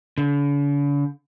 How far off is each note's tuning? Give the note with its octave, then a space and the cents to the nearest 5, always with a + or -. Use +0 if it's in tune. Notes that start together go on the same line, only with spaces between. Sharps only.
D3 -45